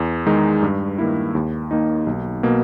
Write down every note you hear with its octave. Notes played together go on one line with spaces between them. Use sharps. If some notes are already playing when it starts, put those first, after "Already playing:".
Already playing: E2
D#3 G#3 D#4
G2
D#3 A#3 E4
D#2
D#3 A#3 D#4
B1
B2 A#3